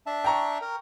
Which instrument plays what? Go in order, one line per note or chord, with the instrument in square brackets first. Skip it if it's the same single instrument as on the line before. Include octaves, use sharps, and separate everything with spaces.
[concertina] D4 E5 A5
[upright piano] G5 A#5 C#6
[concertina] A#4